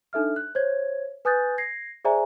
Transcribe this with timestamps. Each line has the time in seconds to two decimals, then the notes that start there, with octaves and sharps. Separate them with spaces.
0.13 D4 D#4 A4 E5 F6
0.36 F#6
0.55 C5 C#5 G#6
1.25 B4 G#5 D#6 F#6 G6 A6
1.58 G#6 A#6 C7
2.05 G#4 C5 D5 E5 G#5 A#5